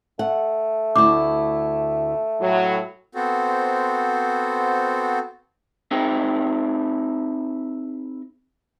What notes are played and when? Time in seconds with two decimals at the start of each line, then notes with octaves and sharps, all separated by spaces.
0.19 A3 F#5
0.96 D2 E4 D6
2.41 A2 F#3
3.15 B3 C4 F#4 A4 C5
5.91 C4 D#4 E4 G#4 C5 G5